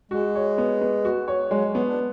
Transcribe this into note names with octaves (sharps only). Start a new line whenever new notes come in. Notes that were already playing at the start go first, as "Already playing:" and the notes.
G#3 F#4
C#5
B3
B3
F#4
C#5
F#3 G#3
F#3
B3
D4